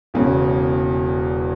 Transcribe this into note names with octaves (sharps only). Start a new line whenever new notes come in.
E1 E2 C#3